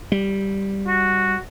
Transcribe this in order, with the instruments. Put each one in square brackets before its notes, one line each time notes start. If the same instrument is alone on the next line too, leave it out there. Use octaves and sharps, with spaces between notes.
[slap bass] G3
[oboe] F#4